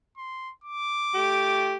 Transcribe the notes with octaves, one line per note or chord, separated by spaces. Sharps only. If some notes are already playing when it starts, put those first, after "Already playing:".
C6
D6
A3 G4